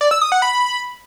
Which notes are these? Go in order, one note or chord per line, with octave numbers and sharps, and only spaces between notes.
D5
E6
D#6
F#5
B5